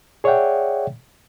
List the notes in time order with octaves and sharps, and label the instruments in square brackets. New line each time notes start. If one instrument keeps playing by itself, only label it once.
[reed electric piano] G#4 C#5 D5 E5 F#5 G5